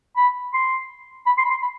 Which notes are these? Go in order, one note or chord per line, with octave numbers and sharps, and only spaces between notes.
B5
C6
B5
C6
B5
C6
B5